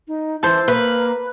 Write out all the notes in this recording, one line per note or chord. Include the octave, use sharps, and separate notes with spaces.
D#4
E3 A4 C5
A#3 B4